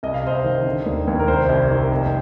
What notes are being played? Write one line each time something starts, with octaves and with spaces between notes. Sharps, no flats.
C2 D#5
F5
C2 C5 D#5
D#3
D3
D#2
D#2
A#4
C2 C5
C2
D#3
F1